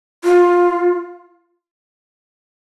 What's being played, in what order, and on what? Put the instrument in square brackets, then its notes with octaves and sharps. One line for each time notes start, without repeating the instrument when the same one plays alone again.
[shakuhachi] F4